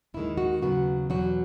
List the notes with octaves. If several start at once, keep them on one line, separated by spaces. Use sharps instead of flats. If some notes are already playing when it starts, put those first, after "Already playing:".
D#2 D#3 G#3 E4
F#4
D#2 C#3 F#3 B3 F#4
E2 B2 F#3 F#4